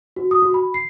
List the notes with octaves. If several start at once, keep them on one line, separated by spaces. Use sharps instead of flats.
F#4
D#6
F#4
B5
C7